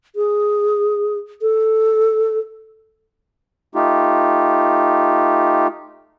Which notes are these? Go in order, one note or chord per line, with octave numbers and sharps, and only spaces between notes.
G#4
A4
A3 D#4 F4 G4